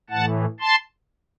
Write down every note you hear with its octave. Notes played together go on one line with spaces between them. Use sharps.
A2 E3 F#5 A5
A5 C6